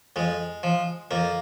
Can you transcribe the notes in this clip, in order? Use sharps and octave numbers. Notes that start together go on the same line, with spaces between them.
F2 G#3
F3
F2 A#3